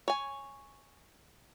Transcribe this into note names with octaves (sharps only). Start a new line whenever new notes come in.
C#5 G#5